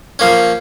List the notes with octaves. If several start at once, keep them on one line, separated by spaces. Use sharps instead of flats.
F3 A#3 C#4